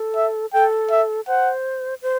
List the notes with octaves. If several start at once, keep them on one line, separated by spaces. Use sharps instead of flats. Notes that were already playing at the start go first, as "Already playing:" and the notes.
Already playing: A4
E5
A4 G5
E5
C5 F#5
C5